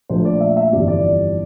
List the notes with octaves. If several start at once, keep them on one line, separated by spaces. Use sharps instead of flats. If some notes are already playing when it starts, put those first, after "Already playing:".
A#1 A#2 F3 A3 C5
D5
E5
E5
G1 F2 E3 G3 D5
D5